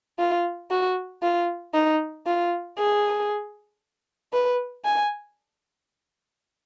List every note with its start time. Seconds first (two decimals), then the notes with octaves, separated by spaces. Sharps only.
0.19 F4
0.71 F#4
1.23 F4
1.74 D#4
2.26 F4
2.78 G#4
4.33 B4
4.85 G#5